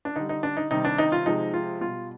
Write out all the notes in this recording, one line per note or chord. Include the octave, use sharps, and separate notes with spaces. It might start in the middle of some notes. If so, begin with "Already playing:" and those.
D4
D3 G3 D#4
D#4
D4
D#4
C3 D#3 G3 D#4
D4
D#4
F4
C3 F3 G#3 D#4
F4
B2 G3 F4